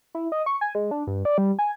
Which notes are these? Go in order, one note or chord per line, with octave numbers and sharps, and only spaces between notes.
E4
D#5
C#6
G#5
G#3
D4
G2
D5
G3
G#5